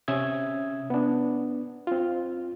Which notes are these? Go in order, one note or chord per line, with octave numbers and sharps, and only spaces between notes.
C3 C#4 E5 D#6 G#6
B3 D4
C4 F4